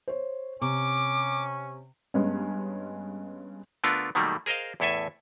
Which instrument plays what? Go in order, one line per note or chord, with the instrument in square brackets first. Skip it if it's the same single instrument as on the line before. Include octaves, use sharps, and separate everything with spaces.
[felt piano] C5 C#5
[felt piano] C3 [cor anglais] C#4 [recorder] D6
[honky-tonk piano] G2 G#3 B3 C#4
[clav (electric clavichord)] D3 A3 B3 D4 F4 A#4
B2 D#3 F#3 G3 A3 A#3
G#4 A#4 C5 D#5 F5
E2 A2 E4 A4 E5 G#5